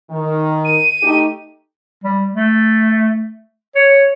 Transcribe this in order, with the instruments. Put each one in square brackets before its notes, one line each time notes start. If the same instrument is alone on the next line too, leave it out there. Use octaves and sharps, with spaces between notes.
[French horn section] D#3
[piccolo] D#7
[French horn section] A3 D#4 G4
[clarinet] G3
A3
C#5